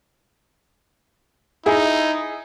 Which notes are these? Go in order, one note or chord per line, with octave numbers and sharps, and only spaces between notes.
D#4 E4 G#4